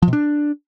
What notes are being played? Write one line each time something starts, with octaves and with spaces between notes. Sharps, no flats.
F3
B2
D4